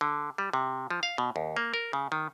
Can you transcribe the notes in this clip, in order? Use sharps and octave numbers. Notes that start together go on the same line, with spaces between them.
D3
G3
C3
F3
F5
B2
D#2
A#3
A#4
C#3
D#3